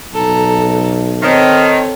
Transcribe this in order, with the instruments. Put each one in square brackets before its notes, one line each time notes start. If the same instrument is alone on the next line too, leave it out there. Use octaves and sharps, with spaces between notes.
[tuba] B1 [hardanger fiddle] A4 A#5
[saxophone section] D#3 [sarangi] C4 [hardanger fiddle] A4 C#5